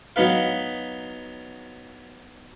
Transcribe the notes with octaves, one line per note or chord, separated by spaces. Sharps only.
F#3 B3 D#4 B4 F5